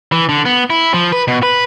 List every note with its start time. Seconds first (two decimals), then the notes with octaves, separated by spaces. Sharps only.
0.12 E3
0.29 D3
0.45 B3
0.70 E4
0.93 F3
1.12 B4
1.28 B2
1.43 B4